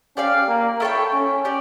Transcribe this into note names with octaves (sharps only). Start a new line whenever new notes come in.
C#4 G4 D5 F5
A#3
E4 A4 C#5 G5
C#4
G4 D5